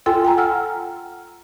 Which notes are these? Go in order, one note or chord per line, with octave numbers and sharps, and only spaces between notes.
F4 A4 G5 G#5 C6 E6
G5 G#5 A#5
F#5 E6 F6